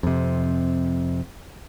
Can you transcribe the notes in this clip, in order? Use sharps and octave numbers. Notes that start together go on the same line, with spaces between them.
F2 C3